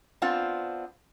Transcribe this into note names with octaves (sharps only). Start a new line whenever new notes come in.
B3 C4 D4 F4